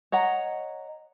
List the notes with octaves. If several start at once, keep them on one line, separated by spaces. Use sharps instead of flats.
C#5 D#5 F#5 A#5